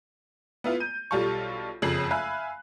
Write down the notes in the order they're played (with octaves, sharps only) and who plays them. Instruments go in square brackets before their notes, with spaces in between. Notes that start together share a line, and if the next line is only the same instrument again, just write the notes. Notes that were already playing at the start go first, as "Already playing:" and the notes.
[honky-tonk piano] B3 E4 F4
G6 D#7
B1 G3 F4 A4 C#6
F#1 F2 C#3 G#4 C7 F#7
E5 F5 G#5 B5 F#6